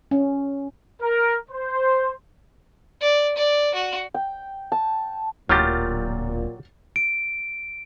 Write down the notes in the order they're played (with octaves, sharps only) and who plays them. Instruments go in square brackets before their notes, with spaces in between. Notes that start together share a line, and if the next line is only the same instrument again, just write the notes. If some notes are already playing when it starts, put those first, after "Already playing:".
[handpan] C#4
[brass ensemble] A#4
C5
[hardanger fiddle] D5
D5
F#4
[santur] G5
A5
[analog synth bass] D1 [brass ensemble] A#2 [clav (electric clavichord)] F#3 F4 G4 [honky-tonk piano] F6 G6 A6
[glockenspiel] D7